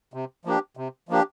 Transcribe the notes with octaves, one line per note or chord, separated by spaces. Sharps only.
C3
F3 A#3 D4 G4
C3
F3 A#3 D4 G4